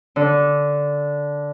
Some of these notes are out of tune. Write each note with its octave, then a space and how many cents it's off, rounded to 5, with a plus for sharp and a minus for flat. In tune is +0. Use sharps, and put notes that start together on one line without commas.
D3 -10